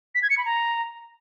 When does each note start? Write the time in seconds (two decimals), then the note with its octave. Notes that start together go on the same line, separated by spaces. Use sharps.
0.15 B6
0.23 G#6
0.30 C#7
0.38 B5
0.45 A#5